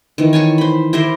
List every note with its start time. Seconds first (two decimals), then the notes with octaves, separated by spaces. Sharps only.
0.18 D#3 E3
0.33 C#5 G#5 A5 C#6
0.58 C5 B5
0.93 E4 G4 A#4 C5